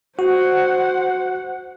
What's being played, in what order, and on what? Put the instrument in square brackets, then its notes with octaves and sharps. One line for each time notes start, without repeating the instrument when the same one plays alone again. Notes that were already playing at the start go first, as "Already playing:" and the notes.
[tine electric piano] F#4 [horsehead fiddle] C5 F#5